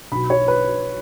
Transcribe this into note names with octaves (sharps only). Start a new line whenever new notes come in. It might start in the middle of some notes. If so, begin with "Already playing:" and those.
B1 B2 B5
C#5
B4